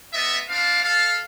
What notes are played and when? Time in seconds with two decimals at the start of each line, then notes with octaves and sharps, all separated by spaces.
0.13 A3 B3 D#5 E5
0.48 C4 D4 F5
0.83 A4 F5